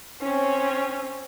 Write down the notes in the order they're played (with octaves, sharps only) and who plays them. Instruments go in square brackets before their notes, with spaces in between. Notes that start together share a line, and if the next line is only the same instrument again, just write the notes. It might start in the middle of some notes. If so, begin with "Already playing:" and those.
[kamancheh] C4 C#4